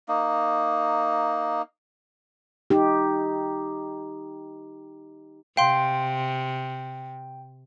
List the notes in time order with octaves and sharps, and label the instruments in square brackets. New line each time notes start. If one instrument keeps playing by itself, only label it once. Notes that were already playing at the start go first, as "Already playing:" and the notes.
[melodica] A#3 D#4
[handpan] D#4 G4
[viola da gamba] C3 [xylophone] F5 C6 [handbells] G5